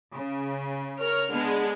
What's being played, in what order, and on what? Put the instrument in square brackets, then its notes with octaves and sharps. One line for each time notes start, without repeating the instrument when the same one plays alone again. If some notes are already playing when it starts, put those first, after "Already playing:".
[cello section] C#3
[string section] A#4 C#5 F6
[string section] D3 G#3 [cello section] B3